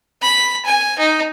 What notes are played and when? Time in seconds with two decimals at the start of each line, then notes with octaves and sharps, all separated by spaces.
0.22 B5
0.65 G#5
0.99 D#4